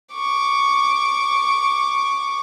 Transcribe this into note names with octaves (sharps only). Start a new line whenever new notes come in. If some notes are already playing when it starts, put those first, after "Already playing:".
C#6 D6